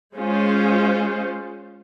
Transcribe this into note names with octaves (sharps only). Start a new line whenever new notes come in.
G#3 C#4 F4 C5